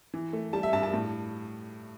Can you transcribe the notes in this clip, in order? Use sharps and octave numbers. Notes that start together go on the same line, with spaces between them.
E3
A3
G3 A5
E5
G2 A5
A5
A2